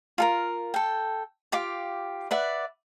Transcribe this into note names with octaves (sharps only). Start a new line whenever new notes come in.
F4 A4 A#4
A4 G5
F4 G4 F5 D6
B4 D5 E5 F#5